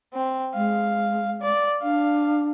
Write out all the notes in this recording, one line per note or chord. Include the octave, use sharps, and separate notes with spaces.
C4
G#3 F5
D5
D4 F5